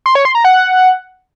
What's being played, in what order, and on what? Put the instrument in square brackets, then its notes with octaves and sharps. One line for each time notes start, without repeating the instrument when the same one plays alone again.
[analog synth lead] C6
C#5
C6
A#5
F#5